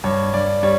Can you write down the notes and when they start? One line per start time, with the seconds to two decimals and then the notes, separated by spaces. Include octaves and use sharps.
0.04 G2 C#5
0.33 G2 D5
0.63 G3 C#5